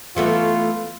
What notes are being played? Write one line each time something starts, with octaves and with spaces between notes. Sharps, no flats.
E3 A3 B3 F4